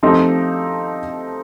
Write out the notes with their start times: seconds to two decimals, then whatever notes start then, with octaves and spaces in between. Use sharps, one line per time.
0.03 F3 A3 C4 D#4 G4